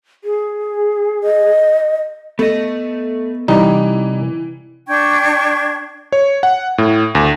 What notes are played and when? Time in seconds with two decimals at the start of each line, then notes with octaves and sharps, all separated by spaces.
0.24 G#4
1.23 D#5
2.39 A3 B3 A4 D#5
3.48 C3 E3 G3 D#4
4.88 D4 G5 C#6 G#6
6.12 C#5
6.43 F#5
6.78 A2
7.15 D2